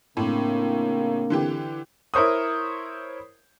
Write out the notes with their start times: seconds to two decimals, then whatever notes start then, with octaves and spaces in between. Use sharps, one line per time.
0.17 A2 C#3 A#3 C4 D4
1.30 D3 E3 G4
2.14 E4 A#4 C5 C#5 D#6